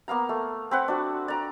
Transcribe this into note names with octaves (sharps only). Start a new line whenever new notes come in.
A#3 B3 F5 A#5
A3
C4 B4 F#5
D4 F#4
D5 A#5